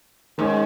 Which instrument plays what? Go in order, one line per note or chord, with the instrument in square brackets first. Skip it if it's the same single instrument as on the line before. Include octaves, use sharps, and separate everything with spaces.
[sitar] G#2 [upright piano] D#3 G#3 C#4